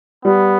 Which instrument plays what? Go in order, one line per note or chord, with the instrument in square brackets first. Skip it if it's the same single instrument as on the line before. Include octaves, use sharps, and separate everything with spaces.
[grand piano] G3 [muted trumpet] B3